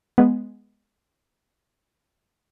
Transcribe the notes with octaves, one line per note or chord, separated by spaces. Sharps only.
G#3 B3